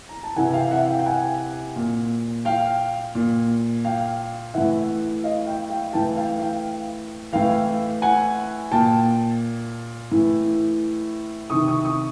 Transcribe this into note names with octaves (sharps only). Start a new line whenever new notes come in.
A#5
A5
C3 E3 F#5 G#5
F5 G5
E5 F#5
F5 G5
G5
F#5 G#5
A#2
F5 G5
A#2
F5 G5
A2 E3 E5 F#5
D#5 F5
F5 G5
F5 G5
A2 E3 G5 A5
F5 G5
F5 G5
A2 E3 F5 G5
F#5 G#5
A#2 G5 A5
A2 E3
C3 D#3 C#6 D#6
C#6 D#6
C#6 D#6